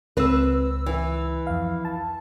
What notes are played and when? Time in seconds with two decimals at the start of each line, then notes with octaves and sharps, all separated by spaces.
0.17 C#2 C4 B4 E6
0.86 E3
1.47 F2 F5
1.85 A5